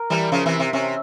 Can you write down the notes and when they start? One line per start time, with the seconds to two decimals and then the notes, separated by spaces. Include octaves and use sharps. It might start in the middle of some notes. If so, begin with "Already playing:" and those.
Already playing: A#4
0.10 E3 G3
0.32 C#3 F3
0.46 C3 E3
0.59 C3
0.73 C3 C#4